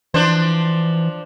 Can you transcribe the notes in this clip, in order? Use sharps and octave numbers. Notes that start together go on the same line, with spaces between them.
E3 F3 D4 C5